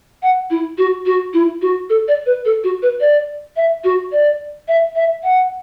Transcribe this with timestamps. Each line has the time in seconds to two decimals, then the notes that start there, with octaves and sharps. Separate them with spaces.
0.23 F#5
0.50 E4
0.78 F#4
1.06 F#4
1.34 E4
1.62 F#4
1.90 A4
2.08 D5
2.26 B4
2.45 A4
2.64 F#4
2.82 B4
3.00 D5
3.56 E5
3.84 F#4
4.12 D5
4.68 E5
4.96 E5
5.23 F#5